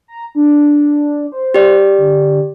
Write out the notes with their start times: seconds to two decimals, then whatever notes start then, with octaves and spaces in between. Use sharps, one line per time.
0.08 A#5
0.35 D4
1.32 C5
1.54 G4 D5
1.98 D3